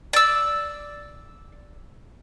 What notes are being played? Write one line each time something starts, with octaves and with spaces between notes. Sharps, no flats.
D5 E6